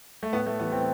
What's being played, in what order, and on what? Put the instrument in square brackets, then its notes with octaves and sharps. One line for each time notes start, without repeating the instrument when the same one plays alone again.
[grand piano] A3
A2 B3
A3
E3 G3 B3
C4